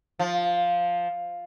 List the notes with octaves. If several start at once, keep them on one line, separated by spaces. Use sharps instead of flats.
F3